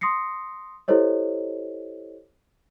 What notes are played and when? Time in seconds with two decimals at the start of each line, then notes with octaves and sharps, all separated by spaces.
0.01 C6 D#6 A#6 C7 C#7
0.88 E4 G4 A4 C5 C#5 D#5